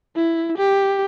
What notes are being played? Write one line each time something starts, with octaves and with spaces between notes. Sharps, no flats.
E4
G4